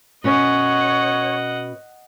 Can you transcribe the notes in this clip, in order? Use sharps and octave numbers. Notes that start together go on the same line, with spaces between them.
B2 C#4 C#5 D#5 F#5